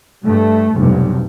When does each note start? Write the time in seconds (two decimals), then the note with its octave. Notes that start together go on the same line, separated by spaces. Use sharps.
0.25 G2 A3
0.76 F1 B1 G2